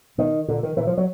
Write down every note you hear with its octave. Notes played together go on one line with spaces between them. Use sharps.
B2 D#3
A#2 D3
D#3
A#2 E3
F3
F#3